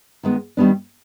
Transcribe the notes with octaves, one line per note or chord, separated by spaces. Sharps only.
D#3 G#3 B3
D#3 G3 B3 D4